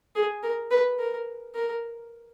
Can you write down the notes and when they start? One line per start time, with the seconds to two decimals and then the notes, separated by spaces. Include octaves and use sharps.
0.16 G#4
0.43 A#4
0.71 B4
0.99 A#4
1.55 A#4